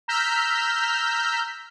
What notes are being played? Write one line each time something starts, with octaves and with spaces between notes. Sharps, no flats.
A#5 E6 F6 G6 B6